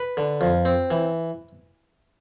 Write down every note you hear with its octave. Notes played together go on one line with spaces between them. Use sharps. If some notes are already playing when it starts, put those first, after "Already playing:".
Already playing: B4
D3
F2
C4
E3